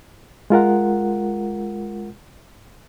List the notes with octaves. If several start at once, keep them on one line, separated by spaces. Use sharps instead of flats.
G#3 F4 A#4 F#5